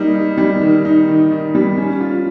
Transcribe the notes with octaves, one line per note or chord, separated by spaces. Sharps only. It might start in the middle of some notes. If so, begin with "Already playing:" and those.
Already playing: G3 A#3 D#4
D#4
G3
D#3
D#4
D#3
D#3
G3
C#4
F4